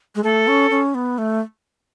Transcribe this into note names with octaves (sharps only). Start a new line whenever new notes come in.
G#3
A3 A4
C#4
C#4
B3
A3